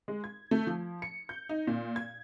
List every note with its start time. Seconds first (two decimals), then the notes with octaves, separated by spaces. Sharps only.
0.08 G#3
0.24 G#6
0.51 A3
0.67 F3
1.02 C#7
1.29 G6
1.49 D#4
1.67 A#2
1.96 G#6